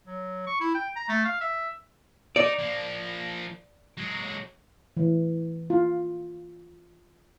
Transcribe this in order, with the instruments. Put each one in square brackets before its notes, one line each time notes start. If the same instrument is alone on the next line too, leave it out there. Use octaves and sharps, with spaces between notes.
[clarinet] F#3
C#6
E4
G5
A#5
A3
F5
E5
[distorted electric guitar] D#4 [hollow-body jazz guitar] D5
[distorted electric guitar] F3 A#3
F#3 G#3
[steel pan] E3
F4